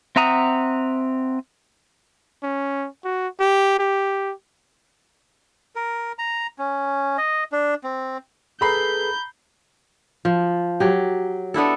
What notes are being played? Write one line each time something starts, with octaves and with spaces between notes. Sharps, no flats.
C4 E5 F#5 A#5 D#6
C#4
F#4
G4
G4
A#4
A#5
C#4
D#5
D4
C4
G#4 A4 B4 A#5 B5 G6 C7
F3
F#3 G4
B3 D4 E4 A4